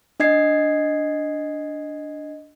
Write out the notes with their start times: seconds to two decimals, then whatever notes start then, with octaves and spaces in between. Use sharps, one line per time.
0.20 D4 D#5 G#6 C7